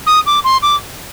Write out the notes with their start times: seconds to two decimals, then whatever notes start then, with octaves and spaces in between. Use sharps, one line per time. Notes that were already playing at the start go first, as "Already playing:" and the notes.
0.06 D#6
0.26 D6
0.44 C6
0.62 D6